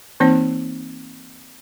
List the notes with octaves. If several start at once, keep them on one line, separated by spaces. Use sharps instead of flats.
E3 A#3 C4 D#4 C5